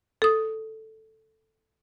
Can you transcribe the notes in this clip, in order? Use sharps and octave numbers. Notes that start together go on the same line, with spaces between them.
A4 D#6